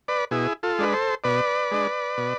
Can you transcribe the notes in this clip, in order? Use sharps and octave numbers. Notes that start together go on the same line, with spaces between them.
B4 D5
B2 E4 G#4
F4 A4
G#3 D4 B4
A4 C5
B2 B4 D5
G#3 D4
B2